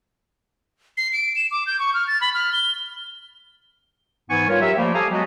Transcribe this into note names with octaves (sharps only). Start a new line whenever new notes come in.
C7
D7
E7
D6
G6
C#6
F6
A6
B5
F6
G7
G#2 E3 B3 G#5 C#6
G3 F4 A#4 C#5
F#3 G4 A#4 E5
F3 G3 A3 A#3
G4 A4 F5 G#5 A#5 D#6
F#3 G#3 B3 F#4 G4